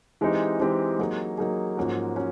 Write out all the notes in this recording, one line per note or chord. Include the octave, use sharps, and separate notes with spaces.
E3 G#3 C4 D#4 G4
E3 G#3 C4 D#4 G4
F#3 A#3 D#4 G#4
F#3 A#3 D#4 G#4
G#2 F3 A#3 C#4 F#4
C#4 F#4